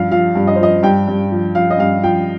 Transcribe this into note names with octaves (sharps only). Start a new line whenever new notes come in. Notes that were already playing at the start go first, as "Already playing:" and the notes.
Already playing: G2 F3 F5
F3 F5
G2
D#5
C5
F3 D#5
G2 G5
G2
F3
F3 F5
D#5
G2 F5
F3 G5